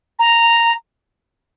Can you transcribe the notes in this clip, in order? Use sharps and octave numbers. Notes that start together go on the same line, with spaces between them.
A#5